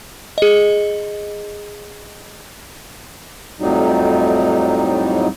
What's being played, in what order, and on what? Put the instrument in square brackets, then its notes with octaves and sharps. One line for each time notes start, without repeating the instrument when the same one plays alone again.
[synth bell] G#4 D#5
[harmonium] F2 A2 F#3 G3 D#4